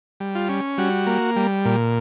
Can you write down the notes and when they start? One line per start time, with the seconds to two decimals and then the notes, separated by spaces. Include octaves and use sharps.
0.20 G3
0.35 F4
0.49 C#4
0.78 G3 F#4
1.07 A#3
1.36 G3
1.65 A#2